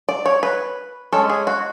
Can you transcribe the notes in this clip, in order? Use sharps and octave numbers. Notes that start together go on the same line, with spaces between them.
D5
C#5
B4
G#3 C#4 A4
G#4
F#4